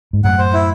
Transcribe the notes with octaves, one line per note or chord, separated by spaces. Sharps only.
G#2
F#2 A2 F#5
C5
E4